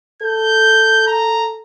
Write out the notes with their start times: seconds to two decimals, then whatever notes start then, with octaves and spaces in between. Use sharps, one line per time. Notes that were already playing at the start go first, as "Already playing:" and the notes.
0.22 A4 G6
1.07 A#5